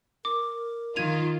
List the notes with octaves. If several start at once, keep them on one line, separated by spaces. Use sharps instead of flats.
A#4 D6
D#3 F4 G#6 D#7 F7